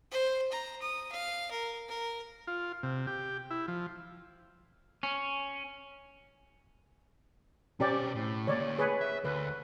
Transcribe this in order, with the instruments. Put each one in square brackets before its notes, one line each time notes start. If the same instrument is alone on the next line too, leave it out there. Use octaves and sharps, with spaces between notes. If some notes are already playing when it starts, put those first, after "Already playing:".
[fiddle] C5
A#5
D#6
F5
A#4
A#4
[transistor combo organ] F4
C3
G4
E4
F3
[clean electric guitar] C#4
[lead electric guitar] B2 C5 [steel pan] C#4 G4 D5
[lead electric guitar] A2
[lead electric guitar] D3 A#3 [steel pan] C#5 D5
[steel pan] G#4 B4 C#5
[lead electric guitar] E5
[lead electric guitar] D2 [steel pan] B4